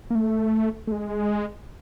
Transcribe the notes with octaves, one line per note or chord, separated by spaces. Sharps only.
A#3
A3
A3
G#3